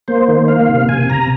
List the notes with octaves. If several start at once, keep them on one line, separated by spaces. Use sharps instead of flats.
A#3 C5
D#3
A#3 F5
C3
C3 G#5
C3 A#5